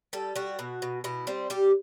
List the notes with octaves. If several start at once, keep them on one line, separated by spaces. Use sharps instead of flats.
G3 A4
G3 F#4
B2
B2
B2 E4
G3 C4
G3 G4